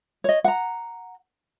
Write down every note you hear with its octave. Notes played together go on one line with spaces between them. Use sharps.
C#5 D#5
F#5 A#5